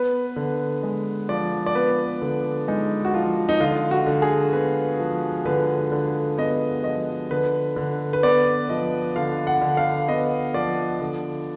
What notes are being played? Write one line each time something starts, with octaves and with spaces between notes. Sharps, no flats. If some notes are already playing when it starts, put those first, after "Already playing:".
Already playing: B3 B4
D3
G#3
F3 D5
D5
B3 B4
D3
G#3 D#4
F#4
F3 F4
D#4
D3 F4
F#4
D3
G#4
B3 B4
F3
D3 B4
D3
B3 D#5
F3 D#5
D3 B4
D3
B4
B3 D5
F3 D#5
D3 F5
F#5
D3
F5
B3 D#5
F3 D5
D3